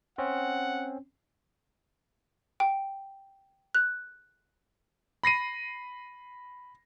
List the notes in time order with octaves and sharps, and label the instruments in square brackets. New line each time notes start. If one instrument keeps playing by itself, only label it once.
[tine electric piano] C4 C#4 [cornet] F#5
[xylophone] G5
F#6
[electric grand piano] B5 A#6 C7 D#7